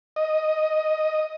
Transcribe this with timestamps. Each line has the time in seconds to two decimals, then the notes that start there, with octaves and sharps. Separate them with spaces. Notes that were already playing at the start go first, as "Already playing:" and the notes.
0.16 D#5